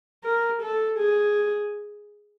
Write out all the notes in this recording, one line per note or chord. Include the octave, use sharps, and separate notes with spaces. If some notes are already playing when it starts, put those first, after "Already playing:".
A#4
A4
G#4